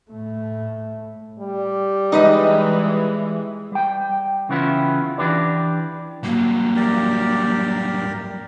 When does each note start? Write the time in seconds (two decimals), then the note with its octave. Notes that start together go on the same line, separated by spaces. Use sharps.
0.11 A2 A3
1.39 G3
2.12 E3 G#3 D#4 B4 D#5
3.72 G3 G5
4.49 C#3 E3 B3 C#4 E4 F4
5.18 E3 D4 G4 B4 D5
6.24 G2 F#3 A#3
6.76 G4 A#4 D5